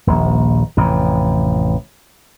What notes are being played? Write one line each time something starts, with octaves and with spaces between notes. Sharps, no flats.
D#1 A#1
A1 F2 C3